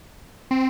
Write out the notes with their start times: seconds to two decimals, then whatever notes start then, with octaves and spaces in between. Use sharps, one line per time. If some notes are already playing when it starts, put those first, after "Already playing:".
0.51 C4